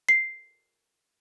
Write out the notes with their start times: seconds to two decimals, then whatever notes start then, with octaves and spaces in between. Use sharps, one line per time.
0.09 C7